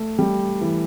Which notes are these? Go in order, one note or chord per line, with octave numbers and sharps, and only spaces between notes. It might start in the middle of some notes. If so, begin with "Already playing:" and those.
Already playing: A3
G3
E3